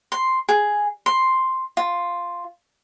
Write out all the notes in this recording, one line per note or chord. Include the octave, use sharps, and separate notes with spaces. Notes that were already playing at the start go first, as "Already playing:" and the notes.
C6
G#4
C6
F4